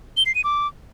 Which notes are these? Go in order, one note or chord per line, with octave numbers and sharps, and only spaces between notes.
G7
C7
D#7
D6